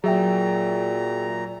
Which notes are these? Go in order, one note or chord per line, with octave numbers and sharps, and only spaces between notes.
A#2 F#3 G#4 E5 G5 A#5